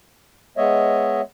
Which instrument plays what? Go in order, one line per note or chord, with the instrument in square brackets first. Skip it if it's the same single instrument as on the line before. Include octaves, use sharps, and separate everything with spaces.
[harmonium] G#3 B3 C#5 D#5 E5